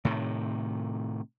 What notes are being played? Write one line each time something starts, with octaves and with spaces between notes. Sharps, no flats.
A2 C3 D#3